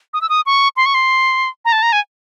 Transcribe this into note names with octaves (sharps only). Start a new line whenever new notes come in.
D#6
E6
D#6
C#6
C6
C#6
C6
A#5
A5
A#5
G#5